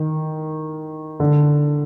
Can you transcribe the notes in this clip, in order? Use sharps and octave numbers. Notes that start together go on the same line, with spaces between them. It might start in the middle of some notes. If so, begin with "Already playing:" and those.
Already playing: D#3
D3